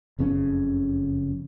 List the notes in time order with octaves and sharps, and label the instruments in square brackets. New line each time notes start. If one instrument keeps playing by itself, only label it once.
[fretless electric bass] F#1 F2 C#3 C#4